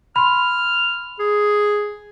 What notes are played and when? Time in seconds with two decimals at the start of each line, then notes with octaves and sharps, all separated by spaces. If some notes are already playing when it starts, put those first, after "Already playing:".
0.16 B5 C6 F6
1.19 G#4